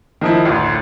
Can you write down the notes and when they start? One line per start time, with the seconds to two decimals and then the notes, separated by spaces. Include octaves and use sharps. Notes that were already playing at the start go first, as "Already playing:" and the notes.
0.21 D#3 F3 E4
0.45 A1 D2